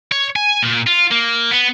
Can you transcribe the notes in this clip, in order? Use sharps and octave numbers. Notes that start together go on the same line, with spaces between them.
C#5
G#5
A#2
F4
A#3
B3